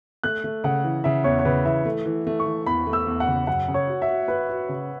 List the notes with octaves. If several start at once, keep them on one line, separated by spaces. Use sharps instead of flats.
A3 F#6
A3
C#3 F#5
E3
C#3 E5
E2 C#5
C#5
C#3 B4
E3 E5
A3
E3
A3
C#6
E3
E2 B5
A3
E6
E2
F#5
C#3
F#2 F#5
C#3
C#5
F#4
E5
F#4
F#4 B4
F#4
C#3